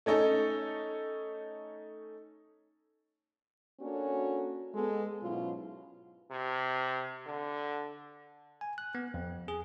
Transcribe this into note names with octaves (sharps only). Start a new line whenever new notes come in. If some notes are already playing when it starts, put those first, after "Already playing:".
A3 C#4 D#4 A4
A#3 C#4 D4 F#4 A4 C#5
G#3 B3 A4
G#2 B2 F#3 C#4 E4 F4
C3
D3
G#5
F#6
B3
F2
G#4